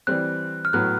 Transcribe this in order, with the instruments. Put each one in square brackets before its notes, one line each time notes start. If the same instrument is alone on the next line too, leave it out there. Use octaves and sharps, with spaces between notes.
[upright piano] E3 G3 C4 [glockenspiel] F#6
[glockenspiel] F6
[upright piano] A2 F#3 B3 [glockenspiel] F#6